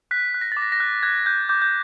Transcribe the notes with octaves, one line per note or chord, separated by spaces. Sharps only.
F#6 B6
F#6
A#6
D6 A6
A#6
A#6
F#6
F#6 G#6
F#6 G6
D6 G6
G6